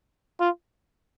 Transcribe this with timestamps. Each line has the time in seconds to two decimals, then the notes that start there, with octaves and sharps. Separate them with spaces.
0.40 F4